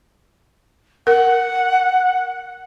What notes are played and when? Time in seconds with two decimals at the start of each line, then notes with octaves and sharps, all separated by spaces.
1.07 A#4 F#5